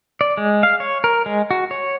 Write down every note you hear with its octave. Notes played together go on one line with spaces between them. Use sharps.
D5
G#3
F5
C#5
A#4
G#3
F#4
C#5